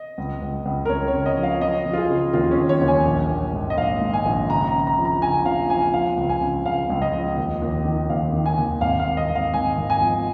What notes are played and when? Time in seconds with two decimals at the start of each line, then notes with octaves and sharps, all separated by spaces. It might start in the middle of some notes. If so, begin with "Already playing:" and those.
Already playing: D#5
0.18 C#2
0.42 C#2
0.65 C#2
0.85 A#4
0.89 C#2 C#5
1.08 C#5
1.13 C#3
1.26 D#5
1.37 F3
1.43 F5
1.61 F3 D#5
1.86 F3
1.93 F4
1.98 G#4
2.09 C#3
2.33 D#2 F4
2.51 C#4
2.58 D#2
2.69 C#5
2.81 D#2
2.88 G#5
3.06 A#1
3.30 A#1
3.53 G#2
3.70 D#5
3.78 A#1 F5
4.01 G#2
4.13 G#5
4.26 A#1
4.50 C#3 A#5
4.68 A#5
4.73 C#3
4.87 A#5
4.98 F3
5.05 A#5
5.21 C#3 G#5
5.46 F3 F5
5.70 F3 G#5
5.94 F3 F5
6.18 C#2
6.29 G#5
6.42 C#3
6.66 C#2 F5
6.90 C#2
7.02 D#5
7.13 F3
7.37 D#2
7.62 D#2
7.85 D#3
8.09 D#2 F5
8.33 D#3
8.46 G#5
8.58 D#2
8.81 G#1 F5
9.00 F5
9.05 G#1
9.17 D#5
9.29 G#1
9.35 F5
9.53 G#1 G#5
9.77 G#1
9.90 G#5
10.01 F3